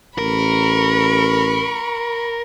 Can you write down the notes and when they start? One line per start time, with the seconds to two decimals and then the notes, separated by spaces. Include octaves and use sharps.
0.18 A1 A#4 B5 C#6